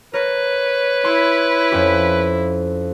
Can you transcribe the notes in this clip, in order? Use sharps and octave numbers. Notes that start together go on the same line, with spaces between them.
A#4 B4 C#5
E4 C6
F2 C#4 G4